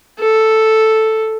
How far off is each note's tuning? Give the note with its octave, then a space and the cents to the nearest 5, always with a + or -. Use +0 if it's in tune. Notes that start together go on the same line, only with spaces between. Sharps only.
A4 +0